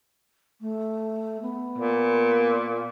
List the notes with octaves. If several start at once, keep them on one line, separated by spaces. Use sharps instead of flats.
A3
B3
A#2